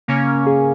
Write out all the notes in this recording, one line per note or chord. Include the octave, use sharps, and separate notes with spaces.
C#3 A#3 C#4
G#4